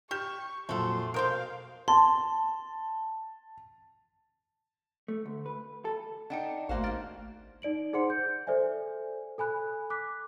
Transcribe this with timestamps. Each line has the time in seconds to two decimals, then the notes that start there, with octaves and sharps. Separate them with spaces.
0.11 G4 C#6 F6 E7
0.69 F2 A#2 F#3 A3 A4 C6
1.14 B2 A#4 C5 F5 G5 D#6 G6
1.88 A5 C6
5.08 A3
5.26 D2
5.46 B4
5.85 A4
6.30 D4 D#4 F#5 G5 C#7
6.69 G#1 A3 A#3 F#4 C5 D#5 F5
6.84 D#4 G4 F6 A6 D7
7.62 D#4 D5 D7 F#7
7.93 D#4 G#4 C5 F#5 C6 C#7
8.10 G6
8.47 A4 C5 D5 E5 G#5
9.38 A4 G#5 B5 F#6
9.90 D6 F#6 B6